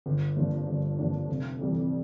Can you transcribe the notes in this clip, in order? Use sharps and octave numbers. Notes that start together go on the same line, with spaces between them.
G1
G2 F3 A#3 D4
G1
G2 F3 A#3 D4
F1
F2 E3 G3